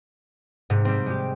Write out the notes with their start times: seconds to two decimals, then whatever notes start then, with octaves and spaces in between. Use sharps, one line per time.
0.70 G#2 C3
0.85 G3 C4
1.06 G#3 G4